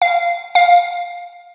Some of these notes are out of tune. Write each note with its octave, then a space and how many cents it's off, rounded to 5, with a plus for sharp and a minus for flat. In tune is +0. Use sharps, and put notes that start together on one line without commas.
F5 -15
F5 +10